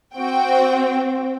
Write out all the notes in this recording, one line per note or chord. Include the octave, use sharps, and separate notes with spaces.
C4 F#4 G5